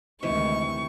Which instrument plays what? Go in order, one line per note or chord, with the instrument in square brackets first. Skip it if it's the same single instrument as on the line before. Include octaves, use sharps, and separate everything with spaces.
[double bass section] D2 D#3 G#3 [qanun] C3 E3 E4 [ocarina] D#5 [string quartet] C#6